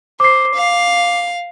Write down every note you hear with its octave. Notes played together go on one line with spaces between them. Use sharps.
C5 D6 C7
F5